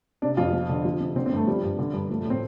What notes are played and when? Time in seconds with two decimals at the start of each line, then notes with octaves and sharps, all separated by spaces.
0.22 C3 D4
0.37 F2 F4
0.53 F3
0.69 D3
0.85 F3
1.00 C3
1.16 D3 C4
1.26 C4
1.32 G2 A3
1.47 F3 G3
1.63 G2
1.79 D3
1.93 G2
2.10 F3 A3
2.20 A3
2.25 A2 C4